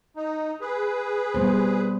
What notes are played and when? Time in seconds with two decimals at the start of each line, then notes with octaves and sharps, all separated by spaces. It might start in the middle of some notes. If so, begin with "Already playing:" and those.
0.16 D#4
0.61 G#4 B4
1.35 G3 B3 C5